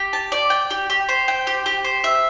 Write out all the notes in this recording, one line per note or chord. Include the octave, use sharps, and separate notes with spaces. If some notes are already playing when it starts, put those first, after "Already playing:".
Already playing: G4
A5
D5
G5
G4
G4
C5
G5
G4
G4
C5
E5